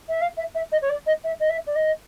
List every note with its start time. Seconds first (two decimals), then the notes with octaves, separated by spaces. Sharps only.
0.09 E5
0.21 F5
0.37 E5
0.55 E5
0.72 D#5
0.82 C#5
0.90 D5
1.06 D#5
1.24 E5
1.40 D#5
1.49 E5
1.67 D5
1.76 D#5